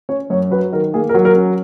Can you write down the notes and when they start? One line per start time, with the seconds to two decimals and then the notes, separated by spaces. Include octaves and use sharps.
0.09 C#4 C#5
0.30 F#2 C#5
0.51 F#3 B4
0.72 D#3 A#4
0.94 A#3 G#4
1.09 A#4
1.14 F#3
1.25 A#4
1.36 C#4